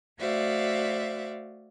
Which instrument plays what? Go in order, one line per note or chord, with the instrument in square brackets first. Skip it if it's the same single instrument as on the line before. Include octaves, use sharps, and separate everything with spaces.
[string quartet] A3 F#4 C5 D5 E5 F5